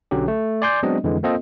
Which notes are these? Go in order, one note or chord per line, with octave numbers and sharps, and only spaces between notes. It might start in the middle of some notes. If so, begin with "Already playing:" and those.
B1 D3 F#3 C#4 G4
A3
D5 G#5 C6 D6 G6
F#3 G#3 B3 C4 D4 D#5
F2 D3 E3 G#3
A#3 C4 F4 A4 D#5